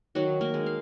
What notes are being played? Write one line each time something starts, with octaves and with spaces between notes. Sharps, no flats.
D#3 F#3 F#4
A#3 A#4
G#3
F5